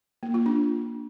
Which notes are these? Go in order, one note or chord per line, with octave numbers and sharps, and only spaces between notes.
A#3
F4
D4